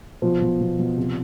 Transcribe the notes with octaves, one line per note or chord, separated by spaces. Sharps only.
B2 F3
B2
B2
B2
C3